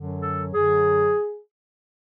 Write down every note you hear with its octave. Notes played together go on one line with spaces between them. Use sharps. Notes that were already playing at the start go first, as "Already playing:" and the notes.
Already playing: F#2 D3 F#3
A4
F#2 D3 F#3 G#4